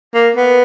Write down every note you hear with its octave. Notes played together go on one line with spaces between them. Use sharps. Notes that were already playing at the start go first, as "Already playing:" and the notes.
A#3
B3